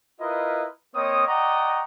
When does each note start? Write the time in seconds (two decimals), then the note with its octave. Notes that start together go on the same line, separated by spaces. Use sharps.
0.21 E4 F4 A#4 B4 D#5
0.95 A#3 C4 C#5 D#5 D#6
1.27 D5 D#5 F#5 G5 A#5 C#6